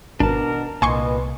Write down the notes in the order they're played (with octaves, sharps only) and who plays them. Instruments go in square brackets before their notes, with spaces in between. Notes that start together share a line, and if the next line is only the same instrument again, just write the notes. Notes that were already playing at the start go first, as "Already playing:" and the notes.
[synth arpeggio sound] G#1 [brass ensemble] B2 A#4 [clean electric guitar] D4 A5
[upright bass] C2 [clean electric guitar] A#2 [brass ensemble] B4 D#5 [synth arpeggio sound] G#5 C6 C#6